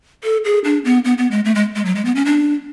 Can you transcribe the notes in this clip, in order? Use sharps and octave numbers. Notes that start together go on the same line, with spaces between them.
A4
G#4
D4
B3
B3
B3
G#3
A3
G#3
G#3
F#3
G#3
B3
C#4
D4